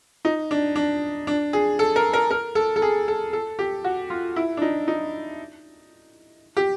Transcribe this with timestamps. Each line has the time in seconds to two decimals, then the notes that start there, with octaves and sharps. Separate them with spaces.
0.25 D#4
0.51 D4
0.76 D4
1.27 D4
1.53 G#4
1.79 A4
1.96 A#4
2.13 A#4
2.31 A#4
2.55 A4
2.76 A4
2.82 G#4
3.08 A4
3.33 A4
3.59 G4
3.84 F#4
4.10 F4
4.36 E4
4.57 D4
4.62 D#4
4.88 D#4
6.57 G4